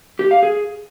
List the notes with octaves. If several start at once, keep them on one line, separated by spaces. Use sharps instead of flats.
G4
F5
G#4